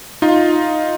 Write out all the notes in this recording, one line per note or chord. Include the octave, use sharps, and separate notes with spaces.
D#4 F4